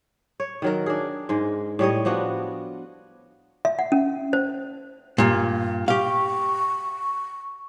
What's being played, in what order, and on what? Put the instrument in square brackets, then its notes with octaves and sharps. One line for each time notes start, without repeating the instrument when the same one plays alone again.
[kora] C#5
D#3 F#3 A#4
D4 G#4
G#2 G#3
A2 G3 C#5 D#5
F3 B3 D4 F#4
[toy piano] E5
F#5
C#4
C5
[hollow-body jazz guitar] G2 A#2
[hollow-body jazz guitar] G4 F5 [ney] C#6